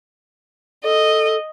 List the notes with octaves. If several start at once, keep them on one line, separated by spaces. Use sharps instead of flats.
A4 D#5